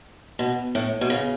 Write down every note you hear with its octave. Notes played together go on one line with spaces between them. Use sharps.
B2
A2
B2
C#3